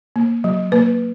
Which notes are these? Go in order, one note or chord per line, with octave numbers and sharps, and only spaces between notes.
A#3
F#3
A#3 B4